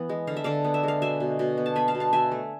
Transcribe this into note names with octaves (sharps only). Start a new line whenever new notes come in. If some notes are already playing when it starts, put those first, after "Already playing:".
Already playing: E3 B3
G#3
D3 F5
E5
D3 D5 F5
B3
E5
G#3 F5
B2 E5 G#5
B2
B2
B3
A5
B3 G#5 B5
F5 A5
B2
F5 A5
B2 E5 G#5
A3